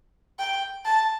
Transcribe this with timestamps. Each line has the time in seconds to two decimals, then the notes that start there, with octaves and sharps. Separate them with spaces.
0.39 G5
0.85 A5